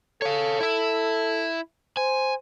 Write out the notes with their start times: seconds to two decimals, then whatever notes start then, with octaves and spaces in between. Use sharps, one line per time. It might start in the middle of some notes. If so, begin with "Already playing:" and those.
0.22 A4 C#5 F5
0.60 E4 E5
1.97 C5 G#5